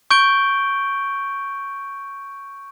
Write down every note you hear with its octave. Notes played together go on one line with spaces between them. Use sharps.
C#6 G6 D7 G7